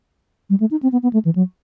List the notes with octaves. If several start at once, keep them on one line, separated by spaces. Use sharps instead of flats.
G3
A3
D#4
C4
B3
B3
A3
E3
F#3